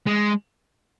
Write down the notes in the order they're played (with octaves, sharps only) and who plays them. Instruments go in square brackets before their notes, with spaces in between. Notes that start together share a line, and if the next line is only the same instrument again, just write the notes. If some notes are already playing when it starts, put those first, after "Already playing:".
[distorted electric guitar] G#3